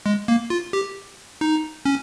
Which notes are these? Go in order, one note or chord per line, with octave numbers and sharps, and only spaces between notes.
G#3
A#3
F4
G4
D#4
C#4